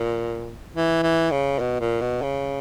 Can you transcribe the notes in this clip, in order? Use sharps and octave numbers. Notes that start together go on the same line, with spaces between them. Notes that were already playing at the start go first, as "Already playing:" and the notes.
Already playing: A#2
E3
E3
C#3
B2
A#2
B2
C#3